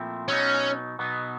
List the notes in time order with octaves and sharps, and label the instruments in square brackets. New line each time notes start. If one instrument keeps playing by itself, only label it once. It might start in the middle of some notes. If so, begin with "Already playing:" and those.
Already playing: [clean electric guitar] A#2 F3 A3 C4 E4
[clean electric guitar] B2 F#3 B3 D#4 [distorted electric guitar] C#4
[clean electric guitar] B2 F#3 B3 D#4